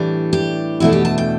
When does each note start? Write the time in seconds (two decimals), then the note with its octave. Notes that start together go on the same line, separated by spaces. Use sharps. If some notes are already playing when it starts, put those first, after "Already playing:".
Already playing: A2 E3 G3 D4
0.33 G4
0.80 E2 B2 A3 D4 E4
0.93 G4
1.05 A5
1.18 G5